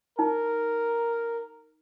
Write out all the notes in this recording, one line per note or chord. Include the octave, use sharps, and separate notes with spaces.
D#4 A#4